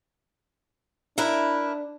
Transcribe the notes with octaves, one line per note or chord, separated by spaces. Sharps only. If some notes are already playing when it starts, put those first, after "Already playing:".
D4 E4 A#4 B4